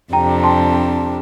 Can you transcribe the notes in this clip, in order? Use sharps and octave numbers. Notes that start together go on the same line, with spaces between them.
F2 C3 G3 D4 G5 A#5
A5 C6